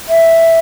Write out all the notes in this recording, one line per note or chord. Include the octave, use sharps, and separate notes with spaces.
E5